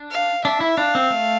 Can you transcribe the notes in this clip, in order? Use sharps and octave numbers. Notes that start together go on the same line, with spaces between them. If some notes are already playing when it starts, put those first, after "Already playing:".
Already playing: D4
F5
D4 E5
E4
D4 F5
C4
A3